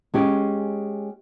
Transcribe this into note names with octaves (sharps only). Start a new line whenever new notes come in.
G#3 C#4 G4